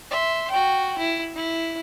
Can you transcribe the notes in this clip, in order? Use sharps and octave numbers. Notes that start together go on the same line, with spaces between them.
E5 C6
F#4 G5
E4
E4